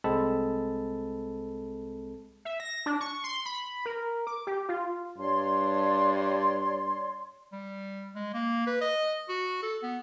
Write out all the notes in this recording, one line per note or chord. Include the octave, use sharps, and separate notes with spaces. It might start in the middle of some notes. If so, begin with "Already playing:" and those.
C2 G#3 C4 A4 A5 B5
E5
A#6
D4
C#6
C6
B5
A#4
D6
G4
F4
G2 C#5 D5 C6
G3
G#3
A#3
B4
D#5
F#4
A4
B3